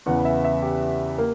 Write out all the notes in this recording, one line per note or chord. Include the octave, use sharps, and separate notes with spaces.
E2 C#3 E3 B3 F#5
E5
E5
G4
A#3